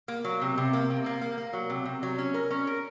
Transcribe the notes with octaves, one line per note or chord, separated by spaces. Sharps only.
A#3
F#3
C3
C3
A#3
C3
A#3
A#3
A#3
F#3
C3
C3
F#3
C#4
A#4
C#4
A#4